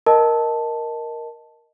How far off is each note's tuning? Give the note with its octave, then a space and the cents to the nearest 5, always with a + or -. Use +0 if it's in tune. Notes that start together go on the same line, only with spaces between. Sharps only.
A#4 +5 D#5 +0 A5 +0